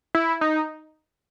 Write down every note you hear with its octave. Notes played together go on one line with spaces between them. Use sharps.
E4
D#4